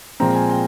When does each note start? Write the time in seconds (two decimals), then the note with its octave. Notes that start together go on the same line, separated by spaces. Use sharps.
0.20 A#2 F3 G#3 C4 A#5
0.35 G#5
0.50 G5